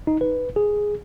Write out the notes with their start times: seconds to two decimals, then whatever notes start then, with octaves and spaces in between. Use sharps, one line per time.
0.07 D#4
0.21 B4
0.56 G#4